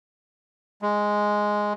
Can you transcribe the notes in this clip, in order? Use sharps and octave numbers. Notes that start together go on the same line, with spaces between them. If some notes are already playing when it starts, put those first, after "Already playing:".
G#3